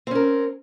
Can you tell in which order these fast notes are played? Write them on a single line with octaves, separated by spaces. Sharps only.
C4 C#4 A#4